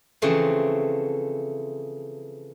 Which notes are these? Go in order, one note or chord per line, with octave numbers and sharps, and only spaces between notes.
C#3 E3 F3 A3 C4